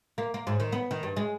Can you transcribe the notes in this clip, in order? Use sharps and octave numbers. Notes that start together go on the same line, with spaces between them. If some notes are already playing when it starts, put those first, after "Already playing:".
A#3
A#3
G#2
D#3
B3
D#3
G2
G#3